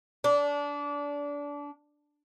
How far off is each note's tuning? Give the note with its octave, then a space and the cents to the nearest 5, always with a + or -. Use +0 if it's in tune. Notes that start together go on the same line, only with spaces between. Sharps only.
D4 -25